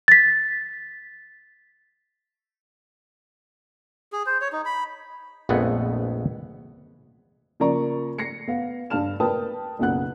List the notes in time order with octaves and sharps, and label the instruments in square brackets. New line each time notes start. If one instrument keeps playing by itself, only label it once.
[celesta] A6 B6
[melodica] G#4
C5
C#5
D#4
B5
[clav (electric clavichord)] A#1 F2 G#3 A3 B3 F#5
[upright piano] C#3 F3 A#3 D5 A#5 C#6
A#6 C7 C#7
B3 F5
G2 F5 A5 F6 E7
A#4 B4 G5 A5 D#6
F#1 B1 C#3 B3 F#5 F#6